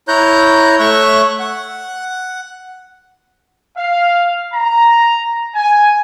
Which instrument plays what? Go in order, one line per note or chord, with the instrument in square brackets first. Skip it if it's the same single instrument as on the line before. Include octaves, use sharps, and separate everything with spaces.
[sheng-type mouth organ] E4 C#5 A#5 F#6 G6
A3 C#5 E5 C#6 F#6
F#5
[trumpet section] F5
A#5
G#5